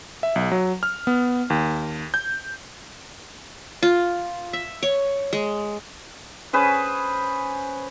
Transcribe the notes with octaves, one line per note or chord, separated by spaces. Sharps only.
E5
B1
F#3
F6
B3
D#2
G6
F4
E5
C#5
G#3
C#4 G#4 B4 C5